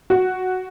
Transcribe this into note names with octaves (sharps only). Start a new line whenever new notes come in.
F#4